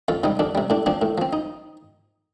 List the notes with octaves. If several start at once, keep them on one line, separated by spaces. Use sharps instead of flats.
F2 F4
C3 G3 D#4
F2 D4
C3 G3
A2 D4
F3 C4 D4
A2
F3 C4
D#4